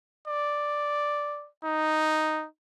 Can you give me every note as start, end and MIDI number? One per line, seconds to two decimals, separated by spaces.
0.28 1.48 74
1.65 2.46 63